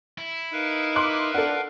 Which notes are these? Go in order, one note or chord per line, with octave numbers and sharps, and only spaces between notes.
E4
D#4 A#4 B4 F5
C6 D6 F#6
D4 A4 F#5